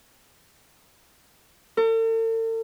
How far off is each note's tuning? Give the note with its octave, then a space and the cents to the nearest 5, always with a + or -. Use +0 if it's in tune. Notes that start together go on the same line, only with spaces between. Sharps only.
A4 +45